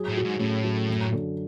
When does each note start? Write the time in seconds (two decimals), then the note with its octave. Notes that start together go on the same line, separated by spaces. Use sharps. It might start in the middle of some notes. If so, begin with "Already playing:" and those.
Already playing: F#3 G#4
0.09 A2
0.17 F#4
0.24 G#2
0.40 A2 C#4
0.64 F#3
0.88 F#2
1.12 D3